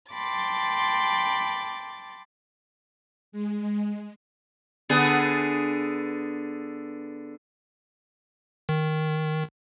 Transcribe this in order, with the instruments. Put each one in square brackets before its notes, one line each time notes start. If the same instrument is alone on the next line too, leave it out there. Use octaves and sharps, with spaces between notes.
[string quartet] G5 A5 B5 C6 D6 A6
[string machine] G#3
[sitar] D3 B3 G#4
[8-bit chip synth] D#3